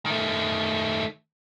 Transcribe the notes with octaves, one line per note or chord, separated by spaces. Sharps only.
D#3 A3